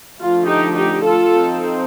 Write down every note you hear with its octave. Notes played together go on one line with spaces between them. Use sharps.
D3 F3 A3 F4
D#4 G4
D#4 G4
F4 A4
F3 C4 D#4